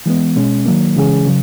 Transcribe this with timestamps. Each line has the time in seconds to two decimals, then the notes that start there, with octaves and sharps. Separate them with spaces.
0.06 E3 G#3 B3
0.36 B2 G#3 C#4
0.66 D#3 F#3 A#3
0.96 C#3 E3 G#3 C#4 G#4
1.27 C#3 F#3